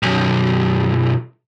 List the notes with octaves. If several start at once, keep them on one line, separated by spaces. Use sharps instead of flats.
B1 F#2